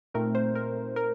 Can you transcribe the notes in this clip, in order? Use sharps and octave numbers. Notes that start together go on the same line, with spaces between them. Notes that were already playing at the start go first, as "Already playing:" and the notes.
A#2 A3 C4 D#4 A#4
C5
A#4
A#4